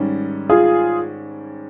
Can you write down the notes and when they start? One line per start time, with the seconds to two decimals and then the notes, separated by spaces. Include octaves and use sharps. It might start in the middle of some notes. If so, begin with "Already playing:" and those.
Already playing: G#2 D#3 G3 C#4
0.49 F4 G#4